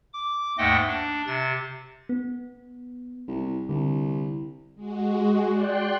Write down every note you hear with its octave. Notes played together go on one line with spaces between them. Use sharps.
D6
D#2 G#2 A3 D#5 F#5 G5
D4
C3 A6
B3
C2
C2 D3
G#3 F#4
D5 G5 C6 F#6